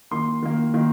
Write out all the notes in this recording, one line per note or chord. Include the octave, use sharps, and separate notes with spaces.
D#3 A#3 C6
D#3 A#3
D#3 A#3